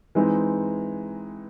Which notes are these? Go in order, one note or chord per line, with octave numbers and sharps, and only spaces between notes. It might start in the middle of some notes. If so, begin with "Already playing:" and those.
E3 G#3 C4 D#4